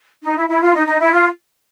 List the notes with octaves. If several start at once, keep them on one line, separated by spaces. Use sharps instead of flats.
D#4
E4
E4
F4
D#4
D#4
E4
F4